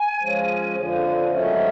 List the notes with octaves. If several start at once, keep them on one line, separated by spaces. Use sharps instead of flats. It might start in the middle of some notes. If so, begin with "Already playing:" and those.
Already playing: G#5
F3 G#3 C#4
F2 D3 F3
G#2 D#3 F#3 A3 C#4